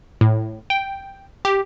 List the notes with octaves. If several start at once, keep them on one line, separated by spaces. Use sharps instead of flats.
A2
G5
G4